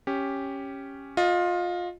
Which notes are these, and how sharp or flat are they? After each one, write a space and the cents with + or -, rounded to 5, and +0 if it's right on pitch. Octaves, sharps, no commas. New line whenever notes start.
C#4 -5 G4 +0
F4 +20 D#5 +0